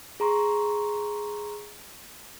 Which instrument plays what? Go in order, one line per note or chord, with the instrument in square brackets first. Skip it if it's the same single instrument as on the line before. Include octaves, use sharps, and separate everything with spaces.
[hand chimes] G#4 A#5 C6 C#6